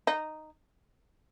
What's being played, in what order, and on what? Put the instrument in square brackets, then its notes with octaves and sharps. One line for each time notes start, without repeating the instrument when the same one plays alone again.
[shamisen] D#4